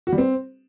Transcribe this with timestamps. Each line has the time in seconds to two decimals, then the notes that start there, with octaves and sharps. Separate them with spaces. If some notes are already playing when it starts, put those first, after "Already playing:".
0.07 F#4
0.12 G3
0.18 C4